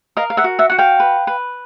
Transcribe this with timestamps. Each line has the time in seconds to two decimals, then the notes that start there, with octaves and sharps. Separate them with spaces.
0.17 A#4 D#5 F5
0.30 F5
0.37 E5 F#5
0.44 F#4
0.59 E5 F#5
0.70 F#4 F#5
0.78 F5 G5
1.00 B4
1.27 B4